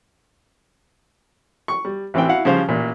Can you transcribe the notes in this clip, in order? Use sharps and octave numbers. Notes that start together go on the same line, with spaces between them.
C#6
G3
A1 E3 C4 G5
E4 F#4 F5 F#5
C#3 F3 G3 C5 F5
A1 A#2